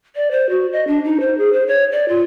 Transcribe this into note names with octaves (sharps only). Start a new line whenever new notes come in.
D5
C5
F#4
D#5
D4
D#4
C5
G#4
C5
C#5
D5
F4